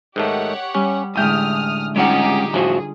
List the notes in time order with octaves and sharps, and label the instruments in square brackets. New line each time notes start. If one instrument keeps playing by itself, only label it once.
[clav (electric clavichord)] G#2 D#3 A3 [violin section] G4 C#5 F#5
[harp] G3 [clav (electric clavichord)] C#4
[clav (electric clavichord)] A1 G5 [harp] D3 G#3 E5 [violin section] D#6 F6
[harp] G3 F4 [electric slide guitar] G#3 C#4 F#5 [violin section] D#4 G4 G#4
[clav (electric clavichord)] A1 F3 [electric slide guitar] F#3 F#4 [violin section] G#4